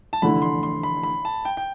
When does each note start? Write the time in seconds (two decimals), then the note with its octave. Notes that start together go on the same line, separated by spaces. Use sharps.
0.13 A5
0.22 F1 E2 D3 A3 E4 B5
0.42 C6
0.63 C6
0.83 B5
1.03 B5
1.25 A5
1.45 G5
1.57 G5